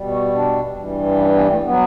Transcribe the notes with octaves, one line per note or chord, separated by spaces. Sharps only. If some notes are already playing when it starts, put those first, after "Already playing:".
Already playing: B2 G3
F#4
D4
G2 E3 G3
C#4
B3
A3
F#3 B3